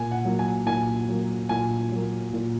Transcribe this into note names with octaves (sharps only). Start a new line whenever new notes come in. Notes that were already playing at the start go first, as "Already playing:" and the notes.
Already playing: A#2 G#5
F#5
F#3 A#3
G#5
A#2 G#5
F#3 A#3
A#2 G#5
F#3 A#3
A#2